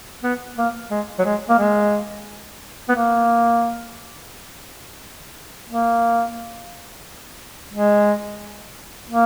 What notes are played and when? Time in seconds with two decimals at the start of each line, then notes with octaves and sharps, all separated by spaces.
0.23 B3
0.57 A#3
0.90 G#3
1.19 F#3
1.25 G#3
1.49 A#3
1.58 G#3
2.88 B3
2.95 A#3
5.67 A#3
7.72 G#3
9.08 A#3